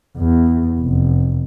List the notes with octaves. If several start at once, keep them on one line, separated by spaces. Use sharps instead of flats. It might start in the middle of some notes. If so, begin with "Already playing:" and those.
E2
F1